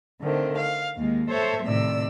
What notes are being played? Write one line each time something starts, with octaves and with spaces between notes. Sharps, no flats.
D3 D#3 A3 C4
F5
D#2 G#3
A4 C5 C#5 E5
A2 C3 D#3 D5 E6